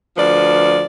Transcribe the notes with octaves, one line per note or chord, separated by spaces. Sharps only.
D2 F3 B4 D5